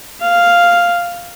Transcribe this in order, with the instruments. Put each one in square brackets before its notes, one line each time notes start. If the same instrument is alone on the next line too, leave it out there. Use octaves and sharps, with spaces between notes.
[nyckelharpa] F5